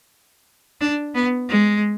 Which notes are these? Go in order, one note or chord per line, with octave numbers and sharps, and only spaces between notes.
D4
B3
G#3